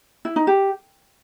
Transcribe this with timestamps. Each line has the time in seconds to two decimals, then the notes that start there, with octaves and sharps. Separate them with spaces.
0.25 E4
0.36 D#4
0.47 G4